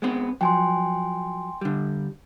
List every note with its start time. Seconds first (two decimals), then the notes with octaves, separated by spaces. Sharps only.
0.02 G#3 B3 C4
0.41 F3 F#3 G5 G#5 C6
1.61 D3 G3